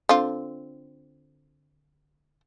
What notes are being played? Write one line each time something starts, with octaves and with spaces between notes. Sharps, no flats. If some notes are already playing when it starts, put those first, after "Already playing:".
D3 C4 F4